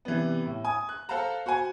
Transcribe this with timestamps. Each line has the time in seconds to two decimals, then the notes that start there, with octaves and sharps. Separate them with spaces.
0.05 C3 E3 G3 B3
0.46 A2
0.65 G#5 D#6
0.89 F#6
1.09 A4 C5 F5 F#5 A5 A#5
1.46 F#4 C5 F#5 G#5